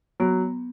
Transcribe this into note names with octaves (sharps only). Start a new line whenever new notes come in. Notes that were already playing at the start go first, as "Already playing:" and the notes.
F#3 B3